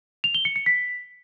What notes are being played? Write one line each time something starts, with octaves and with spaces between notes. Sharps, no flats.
F7
G7
C#7
C#7
B6